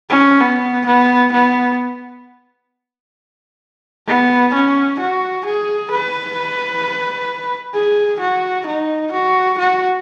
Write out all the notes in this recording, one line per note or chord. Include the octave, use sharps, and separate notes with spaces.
C#4
B3
B3
B3
B3
C#4
F#4
G#4
B4
G#4
F#4
D#4
F#4
F#4